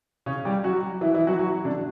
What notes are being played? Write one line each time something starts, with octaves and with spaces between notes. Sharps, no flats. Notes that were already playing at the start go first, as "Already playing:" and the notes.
C#3 C#4
G3 G4
F#3 F#4
E3 E4
E3 E4
F#3 F#4
F#3 F#4
D3 D4